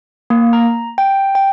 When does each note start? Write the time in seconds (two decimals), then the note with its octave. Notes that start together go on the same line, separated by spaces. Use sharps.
0.30 A#3
0.53 A#5
0.98 G5
1.35 G5